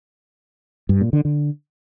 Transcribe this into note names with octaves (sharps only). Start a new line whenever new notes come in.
G2
A#2
D3
D3